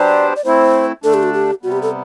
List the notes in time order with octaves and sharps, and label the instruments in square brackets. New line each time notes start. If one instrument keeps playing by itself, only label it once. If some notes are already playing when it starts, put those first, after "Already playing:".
Already playing: [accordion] F#3 B3 D4 G4 C5 [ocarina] D5
[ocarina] D5
[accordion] A3 C4 E4 [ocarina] C5
[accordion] D3 A3 D4 [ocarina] A4
[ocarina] G4
F#4
G4
[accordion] C3 G3 B3 [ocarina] F#4
[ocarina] G4
A4